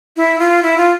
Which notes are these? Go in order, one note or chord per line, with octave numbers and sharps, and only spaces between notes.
E4
F4
E4
F4